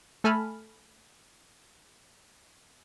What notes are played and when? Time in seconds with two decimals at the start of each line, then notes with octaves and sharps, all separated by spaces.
0.24 A3 A4 G#5 A5 B5 F6